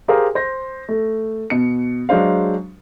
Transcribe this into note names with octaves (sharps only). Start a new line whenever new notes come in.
G4 G#4 A#4 C5 F5
C5 A#6
A3
B2 C#7
F#3 G#3 D4 C5 F5